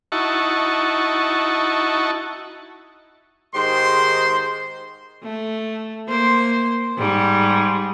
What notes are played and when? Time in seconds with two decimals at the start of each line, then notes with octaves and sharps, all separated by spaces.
0.12 D#4 E4 F#4 A5 C#6
3.55 G#2 D#3 G#3 G4 C5 C6
5.23 A3
6.08 A#3 C5
6.97 G#2 G3